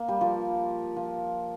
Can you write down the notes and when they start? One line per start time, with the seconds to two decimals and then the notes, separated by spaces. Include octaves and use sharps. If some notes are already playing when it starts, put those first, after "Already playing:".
Already playing: A#3
0.08 G3
0.21 F3
0.96 F3